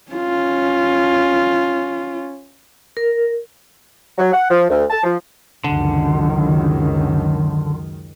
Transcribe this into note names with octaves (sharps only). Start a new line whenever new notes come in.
C#4 F4
A#4
F#3
F#5
F3
D2
A5
F3
C#2 F#2 D3 D#3